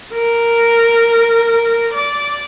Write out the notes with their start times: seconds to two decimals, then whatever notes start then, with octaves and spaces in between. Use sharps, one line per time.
0.13 A#4
1.94 D5